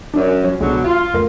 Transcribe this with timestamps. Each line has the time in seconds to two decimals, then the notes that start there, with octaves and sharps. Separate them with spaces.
0.14 F#2 D4 D5
0.44 F#3 C#5
0.60 C#2 B2 D3 F#3 G#3
0.84 F4
1.14 F#2 A3 A#4